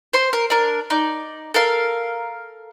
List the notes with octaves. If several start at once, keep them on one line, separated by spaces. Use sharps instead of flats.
C5 C6
A#4
D4 A#4
D#4 D5
A4 A#4 F5